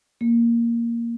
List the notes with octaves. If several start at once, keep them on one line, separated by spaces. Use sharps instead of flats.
A#3